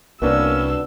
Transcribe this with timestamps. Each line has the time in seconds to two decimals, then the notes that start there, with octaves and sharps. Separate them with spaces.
0.22 C2 A#3 B3 C#4 D4 F#4 B4 E6